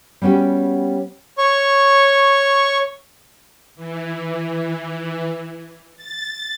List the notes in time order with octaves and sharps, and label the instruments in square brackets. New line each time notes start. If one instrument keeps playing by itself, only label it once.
[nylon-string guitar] G3 B3 C#4 F#4 G4
[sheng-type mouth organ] C#5 C#6
[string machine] E3
A6